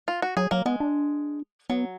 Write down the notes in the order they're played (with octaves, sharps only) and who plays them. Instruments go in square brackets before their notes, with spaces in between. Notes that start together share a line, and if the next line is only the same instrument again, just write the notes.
[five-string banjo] F4
F#4
[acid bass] F#3 [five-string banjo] G#4
[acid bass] F#3 [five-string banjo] A#3
[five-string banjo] G#3 [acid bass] B3
[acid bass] D4
[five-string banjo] F#3 [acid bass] B3